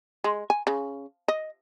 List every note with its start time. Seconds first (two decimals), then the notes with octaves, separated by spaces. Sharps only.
0.24 G#3
0.50 G#5
0.67 C#3
1.28 D#5